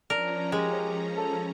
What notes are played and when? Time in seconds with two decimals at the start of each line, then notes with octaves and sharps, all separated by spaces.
0.10 F3 C#4 D4 A#4 A#5
0.52 G#3 G4
1.18 A4